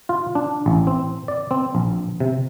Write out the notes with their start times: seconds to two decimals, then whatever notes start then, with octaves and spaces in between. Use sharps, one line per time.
0.09 F4
0.35 D4
0.66 A1
0.87 C4
1.28 D5
1.51 C4
1.75 A#1
2.20 C3